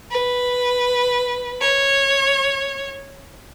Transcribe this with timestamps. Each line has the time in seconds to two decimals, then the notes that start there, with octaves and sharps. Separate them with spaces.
0.11 B4
1.61 C#5